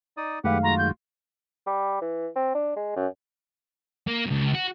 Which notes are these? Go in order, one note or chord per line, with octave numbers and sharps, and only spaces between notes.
D#4 D5 D#6
F#2 D#3 G#3 A3 G4 B4 F5 F#5
F4 F#4 A#5
G6
G3
E3
C4
D4
G#3
F#2
A#3
C#2 F#2
F#4